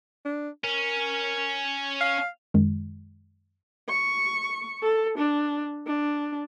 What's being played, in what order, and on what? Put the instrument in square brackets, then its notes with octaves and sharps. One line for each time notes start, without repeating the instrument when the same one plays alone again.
[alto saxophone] D4
[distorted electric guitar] C#4 [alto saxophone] A#4
[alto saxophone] F5
[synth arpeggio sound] F#2 D#3 G#3
[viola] C#6
A4
D4
D4